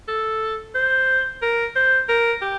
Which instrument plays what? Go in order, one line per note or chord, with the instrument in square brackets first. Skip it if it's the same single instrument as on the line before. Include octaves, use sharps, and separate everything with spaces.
[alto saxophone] A4
C5
A#4
C5
A#4
G4